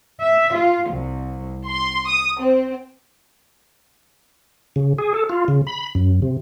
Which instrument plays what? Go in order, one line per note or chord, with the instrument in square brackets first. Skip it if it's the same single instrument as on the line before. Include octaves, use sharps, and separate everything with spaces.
[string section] E5
F4
C2
C6
D#6
C4
[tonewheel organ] C#3
G#4
A4
F4
C#3
B5
F#2
C3